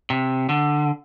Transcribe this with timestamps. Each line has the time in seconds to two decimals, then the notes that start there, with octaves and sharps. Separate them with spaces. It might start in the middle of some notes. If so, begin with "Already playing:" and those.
0.10 C3
0.49 D3